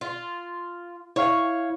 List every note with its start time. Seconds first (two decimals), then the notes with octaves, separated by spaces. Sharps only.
0.01 F4
1.16 E4 C#5 F5